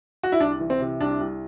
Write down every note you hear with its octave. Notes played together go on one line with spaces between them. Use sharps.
F#4
E4
C2 D4
E3
C4
C3
C2 D4
C2